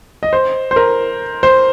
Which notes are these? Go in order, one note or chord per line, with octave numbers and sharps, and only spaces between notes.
D#5
C5
C5
A#4
C5